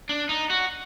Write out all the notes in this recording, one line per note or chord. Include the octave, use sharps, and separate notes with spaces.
D4
D#4
F#4